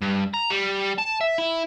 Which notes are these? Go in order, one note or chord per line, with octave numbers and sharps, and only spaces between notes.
G2
A#5
G3
A5
E5
E4